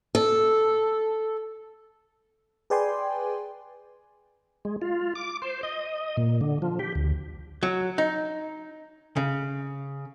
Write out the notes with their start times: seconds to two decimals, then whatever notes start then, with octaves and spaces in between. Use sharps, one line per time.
0.15 A4
2.70 G#4 B4 D5 G5 G#5 C6
4.65 G#3
4.82 F4
5.15 D6
5.42 C5
5.63 D#5
6.17 A#2
6.41 D3
6.62 F3
6.79 G4
6.95 D2
7.63 F#3
7.98 D#4
9.16 C#3